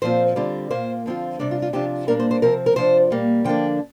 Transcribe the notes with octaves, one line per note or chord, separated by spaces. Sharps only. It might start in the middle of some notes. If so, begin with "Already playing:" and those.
A#2 F3 C4 F4 C5
D3 G3 C4 F4
A#2 A#3 F4 C5
D3 F3 C4 F4
C3 G3 D4 D5
F4
F4
C3 F3 D4 F4 G4
A#2 G3 A#3 D4 A#4
C5
C5
C3 F3 C4 A#4
A#4
C3 F3 D4 F4 C5
A#2 G3 A#3
D3 F3 A#3 D4 G5